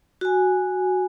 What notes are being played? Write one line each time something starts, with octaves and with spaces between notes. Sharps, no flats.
F#4 G#5